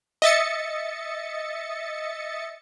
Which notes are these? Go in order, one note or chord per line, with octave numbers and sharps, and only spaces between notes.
D#5 E5 A6 C#7